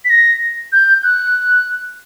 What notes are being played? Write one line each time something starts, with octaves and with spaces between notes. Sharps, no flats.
B6
A#6
G6
F#6